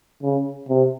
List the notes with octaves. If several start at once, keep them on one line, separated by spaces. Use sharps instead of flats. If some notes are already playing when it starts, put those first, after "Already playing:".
C#3
C3